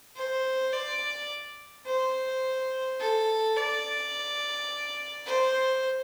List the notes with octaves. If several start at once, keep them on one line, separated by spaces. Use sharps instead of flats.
C5
D5
C5
A4
D5
C5